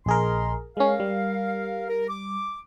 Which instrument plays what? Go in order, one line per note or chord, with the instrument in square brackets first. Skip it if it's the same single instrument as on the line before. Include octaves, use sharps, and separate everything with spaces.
[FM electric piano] A#1 G#4 A#4 [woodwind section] D#5 A#5 C6
[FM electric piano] G#3 C#4 [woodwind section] A#4 F5
[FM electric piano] G3
[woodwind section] A#4
D6